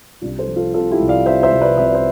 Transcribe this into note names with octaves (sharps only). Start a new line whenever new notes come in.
C2 D4 F4
A4 C5
F3
F4 A4
C3 F4 A4
E4 G4
C2
D5 F5
C3 C5 E5
C5 E5
C2
B4 D5
C2 E5
D5
C5 E5